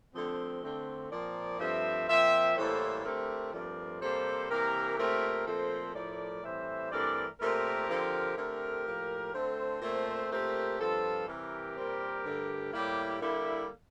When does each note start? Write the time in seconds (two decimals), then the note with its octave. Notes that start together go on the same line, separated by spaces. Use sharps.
0.14 D3 F3 A3 C4
0.63 D3 A3 C4
1.11 A#2 F3 C4 A#4 D5
1.59 G2 F3 A3 C4 C5 E5
2.08 A#2 F3 C4 C5 E5
2.56 A2 E3 G3 A#3 A4 C5
3.04 D3 A3 C4 G4 A#4
3.53 G2 F3 A3 C4 A#4 D5
4.01 C3 G3 A#3 A4 C5
4.49 C3 E3 A#3 G4 A#4
4.98 A#2 A3 C4 G4 A#4
5.46 A#2 F3 A3 C4 A4 C5
5.94 A2 F3 A3 A#4 D5
6.43 A2 E3 G3 C4 C5 E5
6.91 G2 E3 A3 C4 A#4 D5
7.40 A#2 A3 C4 G4 A#4
7.89 D3 F3 C4
8.37 D3 A3 C4 G4 A#4
8.86 A2 F3 A#3
9.34 D3 A3 C4 A4 C5
9.82 A#2 A3 C4
10.30 A#2 A3 C4 G4 A#4
10.79 G2 F3 C4 F4 A4
11.27 C3 E3 G3 G4 A#4
11.76 A#2 G3 C4
12.24 G2 D3 A3
12.73 A2 G3 A#3 E4 G4
13.21 D3 G3 A#3 E4